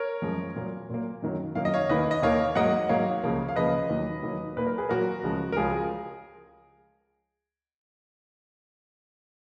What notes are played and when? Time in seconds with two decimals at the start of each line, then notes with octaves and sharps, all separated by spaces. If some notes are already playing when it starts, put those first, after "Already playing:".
Already playing: A#4 C#5
0.22 F#2 F3 G#3
0.55 A#2 F#3 A#3
0.89 A#2 F#3 A#3
1.22 F#2 D#3 F#3 A#3
1.55 F#2 D#3 F#3 A#3 F5
1.65 D#5
1.74 C#5 F5
1.89 D#2 D#3 A#3 B4 D#5
2.11 D#5
2.22 D#2 D#3 A#3 C#5 F5
2.55 G#2 F#3 A#3 D#5 F#5
2.89 G#2 F#3 A#3 C#5 F5
3.23 C#2 C#3 F3 A#3
3.48 F5
3.56 C#2 C#3 F3 A#3 B4 D#5
3.89 D#2 D#3 F#3 A#3
4.23 D#2 D#3 F#3 A#3
4.56 A#2 F#3 A#3 B4
4.67 A#4
4.78 G#4 B4
4.89 A#2 F#3 A#3 F#4 A#4
5.23 C#2 C#3 F3 G#3
5.52 A#4
5.57 C#2 C#3 F3 G#3 F4 G#4